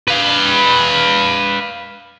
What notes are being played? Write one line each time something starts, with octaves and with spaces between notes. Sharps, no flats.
B4 F5